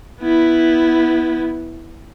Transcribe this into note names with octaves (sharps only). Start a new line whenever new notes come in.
B3 E4